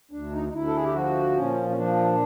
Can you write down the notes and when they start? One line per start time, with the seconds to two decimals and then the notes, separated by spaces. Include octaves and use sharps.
0.11 D2 D4
0.32 D#4
0.49 D#4
0.53 D2 E4
0.67 A4
0.75 G#4
0.84 G4
0.94 F3 F#4
1.36 A#2 C#4
1.70 C#4
1.77 F3 D4